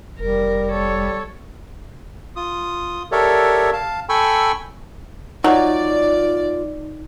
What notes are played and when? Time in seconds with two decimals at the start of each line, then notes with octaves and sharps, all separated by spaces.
0.19 F1 G3 A#4
0.71 A4 C#5
2.36 F4 D#6
3.12 G4 A4 A#4 C#5 D5 E5
3.73 F5 A5
4.09 A4 G5 G#5 B5 C#6 E6
5.44 F#3 D#4 F4 D5